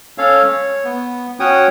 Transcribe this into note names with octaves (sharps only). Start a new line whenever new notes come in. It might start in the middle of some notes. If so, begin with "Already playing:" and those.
C#4 A4 C#5 F5
C#5
B3
C#4 F#4 C#5 G5 D#6